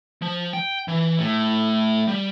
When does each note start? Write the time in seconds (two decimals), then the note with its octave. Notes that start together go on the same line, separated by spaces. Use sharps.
0.22 F3
0.53 G5
0.88 E3
1.19 A2
2.08 G3